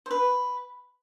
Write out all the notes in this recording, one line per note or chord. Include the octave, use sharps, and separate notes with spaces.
C5
B4